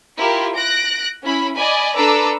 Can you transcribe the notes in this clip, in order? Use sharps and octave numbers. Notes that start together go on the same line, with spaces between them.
E4 F4 G4 A#4
F#6 A#6 D7
C#4 E4 B5
D5 D#5 G#5 B5
D4 A4 B4 A#5 D6 E6